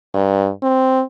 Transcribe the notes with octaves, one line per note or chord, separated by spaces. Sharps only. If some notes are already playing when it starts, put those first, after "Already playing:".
G2
C4